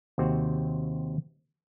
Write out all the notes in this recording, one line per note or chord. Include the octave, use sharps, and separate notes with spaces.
D#2 C3 C4 F#4